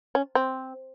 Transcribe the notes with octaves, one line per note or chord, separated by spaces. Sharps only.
C#4
C4